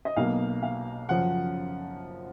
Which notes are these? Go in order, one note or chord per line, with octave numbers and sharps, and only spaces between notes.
D#5
B1 B2 A#3 F5
F5
F#2 C#3 F3 F#5